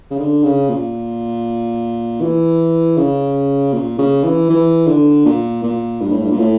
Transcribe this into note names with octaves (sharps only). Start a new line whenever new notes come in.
C#3
D3
C#3
A#2
E3
C#3
A#2
C#3
E3
E3
D3
A#2
A#2
G2
A2
G2
A#2
A2